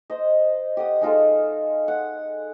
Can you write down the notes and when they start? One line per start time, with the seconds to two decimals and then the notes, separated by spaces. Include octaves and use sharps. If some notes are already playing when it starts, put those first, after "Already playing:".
0.10 C5 D#5
0.77 G4 D#5 F#5 D#6
1.01 G#3 D#4 F4 A4
1.88 F#5